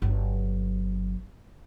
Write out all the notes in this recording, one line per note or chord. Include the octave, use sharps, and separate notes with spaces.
G1 F#3